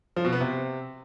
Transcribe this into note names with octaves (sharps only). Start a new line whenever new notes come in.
F3
B2
B3
C3